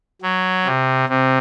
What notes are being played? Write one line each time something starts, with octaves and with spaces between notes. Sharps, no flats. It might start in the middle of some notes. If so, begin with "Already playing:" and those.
F#3
C3
C3